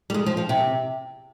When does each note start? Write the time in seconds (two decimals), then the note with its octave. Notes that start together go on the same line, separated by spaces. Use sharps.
0.10 G3
0.14 G#3
0.26 F3
0.37 F3
0.49 C3